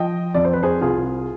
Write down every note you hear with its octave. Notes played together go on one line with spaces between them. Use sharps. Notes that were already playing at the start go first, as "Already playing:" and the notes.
Already playing: F3 D#5 G5
F2 D5
C5
B4
G#4 C5
C2 F4 G#4